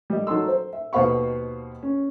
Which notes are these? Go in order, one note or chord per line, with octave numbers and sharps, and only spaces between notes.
G3 D#5
F#3 D#4 A4 C6 E6
C5
E5
D#2 B2 C5 F5 B5 C#6
C#4